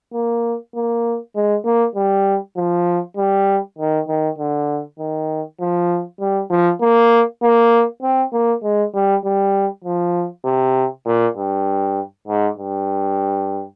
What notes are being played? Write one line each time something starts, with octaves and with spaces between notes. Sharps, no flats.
A#3
A#3
G#3
A#3
G3
F3
G3
D#3
D#3
D3
D#3
F3
G3
F3
A#3
A#3
C4
A#3
G#3
G3
G3
F3
C3
A#2
G2
G#2
G2